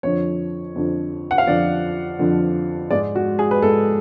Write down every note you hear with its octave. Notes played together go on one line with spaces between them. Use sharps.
F2 D3 F3 C#5
F2 D3 F3
F#5
F5
F2 D3 F3 D5
F2 D3 F3
G#2 G#3 D5
F#4
G#4
B4
G#2 G#3 A4